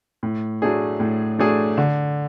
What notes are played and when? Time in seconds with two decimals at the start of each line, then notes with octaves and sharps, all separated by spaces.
0.23 A2
0.62 F#3 A3 D4 G#4
1.00 A2
1.39 F#3 A3 D4 G#4
1.78 D3